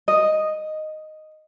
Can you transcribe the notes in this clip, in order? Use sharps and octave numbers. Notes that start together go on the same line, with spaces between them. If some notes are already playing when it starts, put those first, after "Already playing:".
D#5